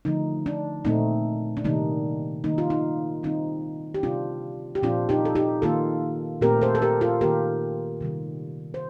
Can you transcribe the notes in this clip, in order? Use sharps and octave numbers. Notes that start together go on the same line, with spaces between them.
D3 F3 A3 D#4
D4
A#2 A3 C4 D#4
D4
C3 D#3 G3 A#3 D#4
D#3 G3 A#3 D#4
F4
D#4
D#3 G3 C4 D#4
G4
C3 G3 C4 D4 F4
G4
A#2 F3 C4 D4 F4
D#4 G4
A4
D#4 G4
D#3 A#3 F4 A4
A#2 A3 C4 G4 A#4
A4 C5
A4
G4 A#4
F4 A4
D#3 A#3 G4 A#4
C3 D#3 G3
C5